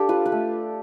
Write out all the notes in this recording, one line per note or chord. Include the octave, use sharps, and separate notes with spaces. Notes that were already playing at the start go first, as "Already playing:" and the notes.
Already playing: D4 G4 A4 F5
F4 B4
B4
A3